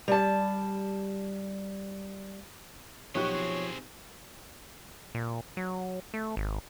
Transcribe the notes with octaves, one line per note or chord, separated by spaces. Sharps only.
G3 A5
B1 F3 F#4 G4 C#5 D#5 C#6 F#6
C4 G#4
A#2
F#3
A3
G#1